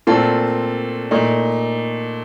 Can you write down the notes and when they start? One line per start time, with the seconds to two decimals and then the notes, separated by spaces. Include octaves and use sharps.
0.07 A#2 A3 C4 F4 A4
1.11 A#2 A3 D#4